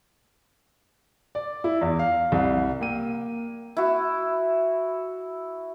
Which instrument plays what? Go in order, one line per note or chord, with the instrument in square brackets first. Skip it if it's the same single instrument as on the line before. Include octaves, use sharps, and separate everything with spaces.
[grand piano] D5
E4
E2
F5
C2
[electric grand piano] A#3 G5 E6 D#7
[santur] E4 F#4